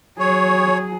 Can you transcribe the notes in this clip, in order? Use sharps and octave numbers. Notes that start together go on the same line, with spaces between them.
F#3 G#4 C#5